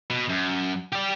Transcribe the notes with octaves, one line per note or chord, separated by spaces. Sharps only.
B2
F#2
G4 D5